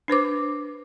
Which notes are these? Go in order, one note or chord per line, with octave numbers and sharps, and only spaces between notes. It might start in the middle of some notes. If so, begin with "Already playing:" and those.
D4 B4 C5 D6